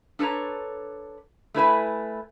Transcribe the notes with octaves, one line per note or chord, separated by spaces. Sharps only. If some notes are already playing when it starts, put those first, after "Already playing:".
D4 A4 B4 C#5 A#5
A3 E4 B4 G#5